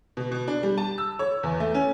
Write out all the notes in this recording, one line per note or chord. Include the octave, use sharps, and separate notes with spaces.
B2
B2
D4
G3
A5
E6
C#5
E2
A3
C#4